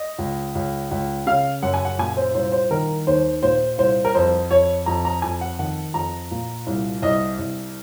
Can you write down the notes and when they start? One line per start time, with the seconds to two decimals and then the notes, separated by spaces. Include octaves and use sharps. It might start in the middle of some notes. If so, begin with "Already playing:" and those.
Already playing: D#5
0.18 C#2
0.55 C#2
0.91 C#2
1.26 C#3 F5
1.63 F#2 F#5
1.74 G#5
1.85 F#5
1.98 A#2 G#5
2.17 C5
2.34 C2 C5
2.52 C5
2.71 D#3 A#4
3.07 D#2 C5
3.43 A#2 C5
3.78 C2 C5
4.05 A#4
4.15 F2 C5
4.51 F2 C#5
4.86 F2 A#5
5.05 A#5
5.22 F2 G#5
5.41 F#5
5.59 D#3 F#5
5.94 F2 A#5
6.31 A#2
6.67 C2
7.02 C2 D#5
7.38 C2